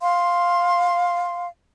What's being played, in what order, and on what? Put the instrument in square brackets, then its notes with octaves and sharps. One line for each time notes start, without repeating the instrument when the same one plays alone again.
[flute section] F5 C6